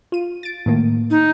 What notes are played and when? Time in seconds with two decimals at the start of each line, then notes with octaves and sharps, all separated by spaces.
0.12 F4 D#7
0.43 A6 D7
0.66 A2 D#3 A#3
1.11 D#4